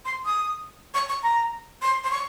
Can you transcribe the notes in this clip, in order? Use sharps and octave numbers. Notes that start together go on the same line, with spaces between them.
C6
D#6
C#6
C#6
A#5
C6
C6
C#6